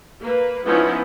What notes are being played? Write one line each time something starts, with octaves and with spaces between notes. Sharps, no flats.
A#3 B4
F3 B3 C#4 D#4 E4